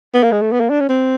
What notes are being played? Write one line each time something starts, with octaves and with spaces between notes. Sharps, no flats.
B3
A#3
G#3
A3
B3
A#3
D4
C#4
C4